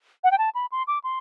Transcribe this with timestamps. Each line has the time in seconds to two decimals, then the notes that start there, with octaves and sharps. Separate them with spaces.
0.24 F#5
0.31 G5
0.38 A5
0.55 B5
0.72 C6
0.87 D6
1.04 C6